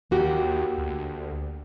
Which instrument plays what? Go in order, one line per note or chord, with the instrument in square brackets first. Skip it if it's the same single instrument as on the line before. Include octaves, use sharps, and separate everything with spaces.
[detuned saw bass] D#2 [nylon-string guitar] A#3 F#4 G4
[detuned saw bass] D2